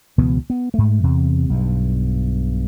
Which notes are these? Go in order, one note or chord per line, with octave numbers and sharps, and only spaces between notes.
C#2 B2 E3 B3
B3
G#2 A3
E2 C3
B1 G2